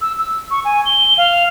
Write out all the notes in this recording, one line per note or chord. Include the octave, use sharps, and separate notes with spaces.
E6
E6
C#6
G#5
G7
F5